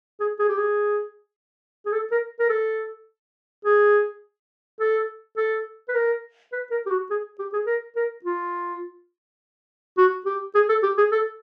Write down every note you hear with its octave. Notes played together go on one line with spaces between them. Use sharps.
G#4
G#4
G4
G#4
G#4
A4
A#4
A#4
A4
G#4
A4
A4
B4
A#4
B4
A#4
G4
F#4
G#4
G4
G#4
A#4
A#4
F4
F#4
G4
G#4
A4
G4
G#4
A4